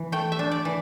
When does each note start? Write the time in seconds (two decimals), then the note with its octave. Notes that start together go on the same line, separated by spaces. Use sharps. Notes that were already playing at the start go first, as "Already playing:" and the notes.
Already playing: E3
0.12 A3 G5
0.32 E5
0.39 D4
0.51 D5
0.65 E3